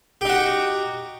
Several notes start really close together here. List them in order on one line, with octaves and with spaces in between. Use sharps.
G4 D#4 F#4